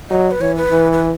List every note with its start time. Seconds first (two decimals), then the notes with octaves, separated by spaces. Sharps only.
0.10 F#3 D#5
0.31 B4
0.41 E3 C#5
0.56 B4
0.71 E3
0.92 B4